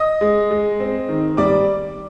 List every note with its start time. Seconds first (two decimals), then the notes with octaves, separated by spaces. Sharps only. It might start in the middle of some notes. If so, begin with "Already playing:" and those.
Already playing: D#5 D#6
0.21 G#3
0.51 G#3
0.80 C4
1.09 D#3
1.37 G3 D5 D6